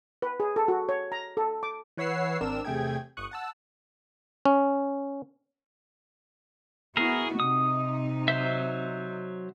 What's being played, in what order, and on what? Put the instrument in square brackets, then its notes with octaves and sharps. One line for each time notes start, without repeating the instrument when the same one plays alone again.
[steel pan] B4
G#4
A4
F#4
C#5
A#5
A4
D6
[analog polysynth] E3 B4 C#5 F#5 E6 C7
G#1 C4 D4 A#4 E6 E7
E2 C3 A3 G#4 G5 G#6
G1 C#6 D#6 F#6
F#5 A5 E6
[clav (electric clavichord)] C#4
[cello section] B3 E4 F#4 [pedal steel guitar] G#4 A#4
[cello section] C3 D#4 [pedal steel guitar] D#6
[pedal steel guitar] F#3 C5 E5